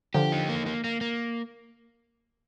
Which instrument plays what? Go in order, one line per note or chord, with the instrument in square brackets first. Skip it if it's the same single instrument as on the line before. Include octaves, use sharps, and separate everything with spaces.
[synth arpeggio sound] D3 F3 [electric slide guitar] G4
[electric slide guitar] D#4
A#3
A#3
A#3
A#3